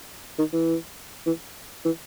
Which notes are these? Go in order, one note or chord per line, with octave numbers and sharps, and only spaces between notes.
D#3
E3
E3
E3